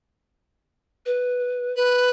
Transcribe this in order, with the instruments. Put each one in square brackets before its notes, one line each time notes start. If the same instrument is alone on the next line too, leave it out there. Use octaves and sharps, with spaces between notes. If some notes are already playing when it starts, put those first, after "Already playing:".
[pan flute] B4
[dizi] B4